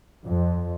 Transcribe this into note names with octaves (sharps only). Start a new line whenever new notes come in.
F2